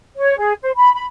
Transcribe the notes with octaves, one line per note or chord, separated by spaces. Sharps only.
C#5
G#4
C5
B5
B5